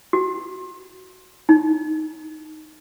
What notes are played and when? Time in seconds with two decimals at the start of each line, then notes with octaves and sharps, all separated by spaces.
0.13 F#4
1.49 D#4